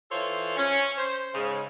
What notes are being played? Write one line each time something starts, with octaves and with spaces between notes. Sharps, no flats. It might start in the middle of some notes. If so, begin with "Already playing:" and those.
E3 F4 A4 C5 C#5
C#4
C5
G#2 C#3